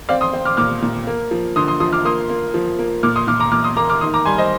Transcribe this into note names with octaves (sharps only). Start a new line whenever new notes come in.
C4 D5 F5
C6 D#6
C4
D6 F6
A#2 D6 F6
A#2
A#3
F3
D3 C6 D#6
C6 D#6
F3 C6 D#6
D6 F6
A#3 C6 D#6
A#3
F3
A#3
A#2 D6 F6
C6 D#6
A#2 D6 F6
A#5 D6
A#2 D6 F6
C6 D#6
A#3 A#5 D6
D6 F6
D#3 C6 D#6
A#5 D6
G3 G#5 C6
C5 D#5